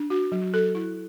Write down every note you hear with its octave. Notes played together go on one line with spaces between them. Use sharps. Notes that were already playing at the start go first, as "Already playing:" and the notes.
Already playing: D4
F#4
F#3
A4
E4